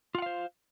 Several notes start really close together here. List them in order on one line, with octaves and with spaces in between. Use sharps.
F4 F#5 F5 C5